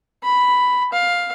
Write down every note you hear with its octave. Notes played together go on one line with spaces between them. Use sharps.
B5
F5